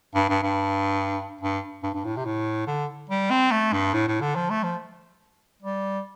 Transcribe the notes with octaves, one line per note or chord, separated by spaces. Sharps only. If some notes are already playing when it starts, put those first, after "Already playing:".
G2
G2
G2
G2
G2
G2
A2
C3
A2
D3
G3
C4
A3
G2
A2
A2
D3
F3
A3
F3
G3